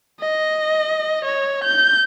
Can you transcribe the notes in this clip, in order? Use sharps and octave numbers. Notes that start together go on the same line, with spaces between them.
D#5
C#5
G6